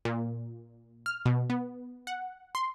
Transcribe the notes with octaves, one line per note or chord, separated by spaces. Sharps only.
A#2
F6
B2
B3
F#5
C6